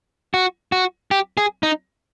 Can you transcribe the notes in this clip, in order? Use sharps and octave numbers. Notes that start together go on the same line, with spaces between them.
F#4
F#4
G4
G#4
D#4